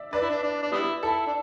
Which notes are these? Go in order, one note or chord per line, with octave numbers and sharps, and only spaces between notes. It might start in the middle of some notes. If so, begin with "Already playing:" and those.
Already playing: D5 E5
D4 B4 D5
E4
D4
D4
D4
G3 B3 E4
E4 A4
D4